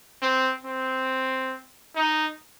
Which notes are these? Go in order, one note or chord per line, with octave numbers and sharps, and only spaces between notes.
C4
C4
D#4